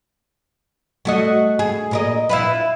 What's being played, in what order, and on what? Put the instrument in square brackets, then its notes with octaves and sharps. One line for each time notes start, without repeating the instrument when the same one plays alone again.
[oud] A3 F#4 D#5
G#4
A#2 A#4 D#5
E4 F4 B4